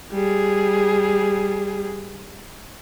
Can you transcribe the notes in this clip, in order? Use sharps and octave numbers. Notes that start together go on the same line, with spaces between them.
G3 G#4